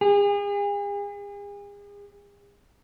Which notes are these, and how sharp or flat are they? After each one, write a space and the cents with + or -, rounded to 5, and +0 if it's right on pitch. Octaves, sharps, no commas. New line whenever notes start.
G#4 -40